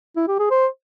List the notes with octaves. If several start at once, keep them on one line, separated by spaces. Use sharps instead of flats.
E4
G4
G#4
C5